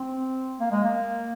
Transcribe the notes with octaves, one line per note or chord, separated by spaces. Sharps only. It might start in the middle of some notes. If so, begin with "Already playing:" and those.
Already playing: C4
A#3
G#3
A#3